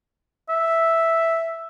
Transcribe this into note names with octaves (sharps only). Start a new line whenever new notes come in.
E5